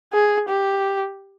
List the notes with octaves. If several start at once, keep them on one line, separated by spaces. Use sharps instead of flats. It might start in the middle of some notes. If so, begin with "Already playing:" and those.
G#4
G4